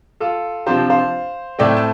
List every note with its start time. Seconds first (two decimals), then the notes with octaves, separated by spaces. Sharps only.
0.20 F4 A4
0.66 C3 F3 D4 F4 G4 C5
0.90 C5 F5
1.59 A2 A3 C4 D5 G5
1.77 A5